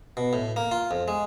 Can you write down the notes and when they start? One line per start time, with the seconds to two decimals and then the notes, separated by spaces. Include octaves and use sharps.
0.17 B2
0.33 A2
0.56 A#3
0.71 F4
0.91 F2
1.08 G#3